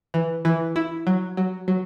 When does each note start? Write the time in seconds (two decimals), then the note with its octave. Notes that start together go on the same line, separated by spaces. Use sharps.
0.14 E3
0.45 E3
0.76 E4
1.07 F#3
1.37 F#3
1.68 F#3